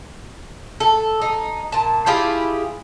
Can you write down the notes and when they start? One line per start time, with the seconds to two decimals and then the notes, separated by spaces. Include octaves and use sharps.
0.80 A4
1.22 D#4
1.72 A#2 A5
2.06 E4 F4 G4 G#4